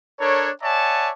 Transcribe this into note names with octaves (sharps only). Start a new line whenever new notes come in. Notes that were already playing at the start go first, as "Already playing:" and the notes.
D4 A4 A#4 C#5
C#5 D5 E5 F#5 G#5 A5